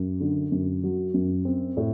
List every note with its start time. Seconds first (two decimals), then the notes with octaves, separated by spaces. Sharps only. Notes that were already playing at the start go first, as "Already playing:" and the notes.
Already playing: F#2
0.20 D3
0.52 F#2
0.83 F#3
1.14 F#2
1.45 C4
1.77 A2